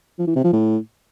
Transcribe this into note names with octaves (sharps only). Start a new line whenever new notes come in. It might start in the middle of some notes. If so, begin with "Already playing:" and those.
F3
E3
C3
F3
A2